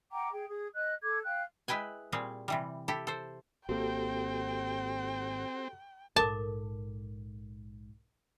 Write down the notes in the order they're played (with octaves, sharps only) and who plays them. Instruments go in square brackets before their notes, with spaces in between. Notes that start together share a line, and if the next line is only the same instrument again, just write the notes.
[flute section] F#5 G5 A#5 D6
G#4 G5
G#4 D#6
D#5 F#6
A4 D6 G#6
F5 G5 F#6
[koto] G#3 E4 B4 G5 G#5
A#2 G3 C4 G#4
C3 E3 G3
E4 G4 A4
A4 C5
[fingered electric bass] G#1 A#3 [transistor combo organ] C4 [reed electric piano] F#4 G4 A4 [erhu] G5
[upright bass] A#1 G#2 [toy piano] A4 A#4 D6 [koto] A5